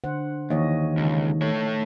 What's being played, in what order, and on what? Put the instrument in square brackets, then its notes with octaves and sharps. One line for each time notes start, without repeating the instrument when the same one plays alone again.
[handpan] D3 C5 F#5
[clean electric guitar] D#2 [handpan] E3 C#5 D#5
[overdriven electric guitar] C#2 [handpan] D#3 D#4 A4
[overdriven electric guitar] A3 C#5 [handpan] A4